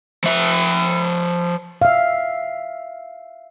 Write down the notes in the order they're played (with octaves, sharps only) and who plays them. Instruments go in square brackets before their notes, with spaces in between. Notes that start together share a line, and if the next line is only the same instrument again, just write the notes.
[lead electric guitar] F3 E5
[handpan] E5 F5